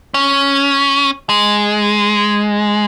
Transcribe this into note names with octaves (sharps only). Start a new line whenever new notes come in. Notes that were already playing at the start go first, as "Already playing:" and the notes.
C#4
G#3